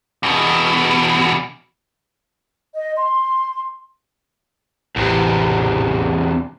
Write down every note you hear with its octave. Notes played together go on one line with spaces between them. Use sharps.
E2 B2
D#5
C6
A1 E2 C3